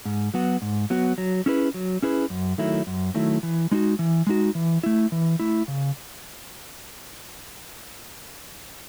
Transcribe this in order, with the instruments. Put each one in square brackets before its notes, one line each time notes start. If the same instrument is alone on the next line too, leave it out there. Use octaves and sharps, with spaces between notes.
[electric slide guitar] G#2
F#3 B3 F#4
G#2
F#3 B3 F#4
F#3
C#4 E4 G#4 B4
F#3
C#4 E4 G#4 B4
F#2
D#3 F#3 A3 E4
F#2
D#3 F#3 A3 E4
E3
G#3 D#4 F#4
E3
G#3 D#4 F#4
E3
A3 E4
E3
A3 E4
C#3